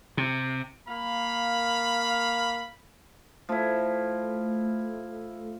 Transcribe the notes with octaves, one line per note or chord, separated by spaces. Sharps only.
C3
A#3 F5 B5
F3 A3 E4